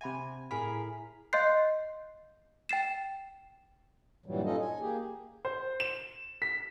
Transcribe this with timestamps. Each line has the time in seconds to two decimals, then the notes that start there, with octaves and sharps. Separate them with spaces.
0.01 C3 E5 F#5 G#5 B5
0.51 A2 G#4 A#4 B5 B6
1.33 D#5 F5 C6 F#6 G6 C7
2.69 G5 A6 C7 E7
4.26 G2 A#2 E3 F#3 G3
4.45 C#4 D#4 F4 A4 D#5
4.61 G#5
4.80 A#3 G4 G#4
5.45 C5
5.80 E7
6.42 B6